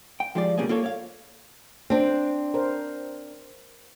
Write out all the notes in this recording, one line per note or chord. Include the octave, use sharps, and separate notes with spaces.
G5
F3 G#3 F4 G4 D5
C#2 B2 G3 A#3 C#4 G#4
A#3 F4 A4 C#5
C#5 F5
C4 D4 C5
A#4 C5